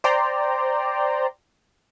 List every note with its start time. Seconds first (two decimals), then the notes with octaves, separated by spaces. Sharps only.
0.04 C5 D5 G5 A#5 C6